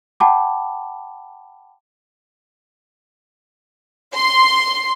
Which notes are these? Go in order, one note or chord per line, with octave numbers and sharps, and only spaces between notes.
F#5 G5 A5 B5 D6
C6